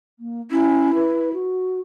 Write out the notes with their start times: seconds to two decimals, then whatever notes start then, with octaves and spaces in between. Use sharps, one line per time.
0.19 A#3
0.51 C#4 E4
0.95 B4
1.33 F#4